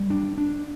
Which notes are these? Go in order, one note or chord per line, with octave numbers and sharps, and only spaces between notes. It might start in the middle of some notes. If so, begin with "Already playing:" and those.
Already playing: G3
D4
D4